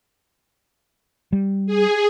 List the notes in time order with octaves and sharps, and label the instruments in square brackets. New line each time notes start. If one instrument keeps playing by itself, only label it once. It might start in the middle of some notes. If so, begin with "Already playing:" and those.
[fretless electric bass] G3
[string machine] G#4